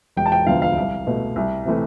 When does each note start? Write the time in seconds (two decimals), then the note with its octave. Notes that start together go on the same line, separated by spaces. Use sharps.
0.16 E1 G5
0.26 A5
0.32 G5
0.46 D2 D3 F3 B3 F5
0.62 F5
0.77 C2
1.07 B2 A3
1.36 C2
1.65 C3 E3 A3